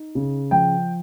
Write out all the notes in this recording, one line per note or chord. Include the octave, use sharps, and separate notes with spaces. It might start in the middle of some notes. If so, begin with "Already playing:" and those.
Already playing: D#4
C#3
F3 G5